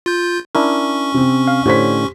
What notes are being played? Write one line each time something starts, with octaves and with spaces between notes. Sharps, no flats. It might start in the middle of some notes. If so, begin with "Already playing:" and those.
F4 G6
C#4 D4 E4 A#4 C#6
C3 C4
F5
A2 D3 G4 C5 C#5 B6